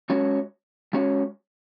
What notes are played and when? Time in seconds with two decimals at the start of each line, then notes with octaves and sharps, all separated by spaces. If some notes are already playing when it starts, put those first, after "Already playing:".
0.10 G#3 C#4 F#4 C#5
0.93 G#3 C#4 F#4 C#5